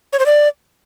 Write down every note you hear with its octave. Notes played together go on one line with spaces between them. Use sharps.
C#5
C5
D5